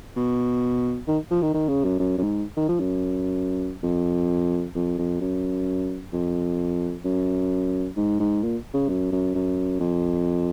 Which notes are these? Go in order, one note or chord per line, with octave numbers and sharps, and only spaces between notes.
B2
D#3
F3
D#3
D#3
C#3
F#2
F#2
F#2
G#2
D#3
F3
F#2
F2
F2
F2
F#2
F2
F#2
G#2
G#2
A#2
C#3
F#2
F#2
F#2
F2